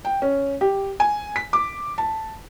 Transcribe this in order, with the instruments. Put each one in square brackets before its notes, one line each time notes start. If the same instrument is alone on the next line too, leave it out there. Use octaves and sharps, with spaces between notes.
[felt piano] G5
C#4
G4
G#5
B6
D6
A5